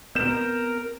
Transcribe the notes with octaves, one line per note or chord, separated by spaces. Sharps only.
B3 C4 A#4 G6 E7